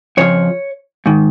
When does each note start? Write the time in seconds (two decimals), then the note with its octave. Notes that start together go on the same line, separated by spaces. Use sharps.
0.17 F2 C#3 F3 C#5
1.06 G#2 D#3